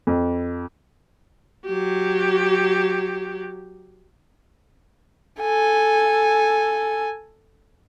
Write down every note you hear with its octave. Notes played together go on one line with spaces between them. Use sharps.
F2
F#3 G4
A4 G#5